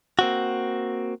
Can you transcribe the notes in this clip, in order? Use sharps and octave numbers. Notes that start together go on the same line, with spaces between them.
A#3 C4 F#4